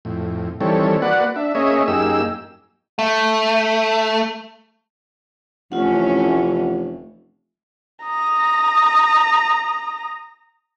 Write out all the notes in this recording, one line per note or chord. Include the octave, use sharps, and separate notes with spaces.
F2 A2
D#3 E3 G3 C4 A4 C#5
A#3 F#4 B4 D5 F#5
D4 E5
A#3 C#4 G#4 C#5 D#5 E5
F#2 A#3 D#4 G4 G#4 E6
A3
F1 E3 A3 C#4 F4 F#5
A#5 D#6